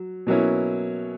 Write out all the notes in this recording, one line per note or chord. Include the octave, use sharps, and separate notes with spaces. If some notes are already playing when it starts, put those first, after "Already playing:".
Already playing: F#3
B2 F#3 A#3 C#4 E4